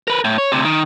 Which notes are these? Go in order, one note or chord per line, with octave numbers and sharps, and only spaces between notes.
A#4 B4
A2
C#5
D2 C3
D#3